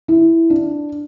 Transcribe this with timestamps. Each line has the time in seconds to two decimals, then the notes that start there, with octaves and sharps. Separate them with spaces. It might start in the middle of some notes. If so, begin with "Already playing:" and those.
0.08 E4
0.50 D4